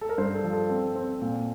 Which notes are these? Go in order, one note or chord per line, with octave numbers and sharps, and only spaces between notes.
A4
A#4
G2 C5
A4
F3
A4
C4
C4
A#2